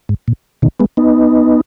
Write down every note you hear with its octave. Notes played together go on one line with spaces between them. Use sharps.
G#2
A#2
B2 D#3
G#3 B3
B3 D#4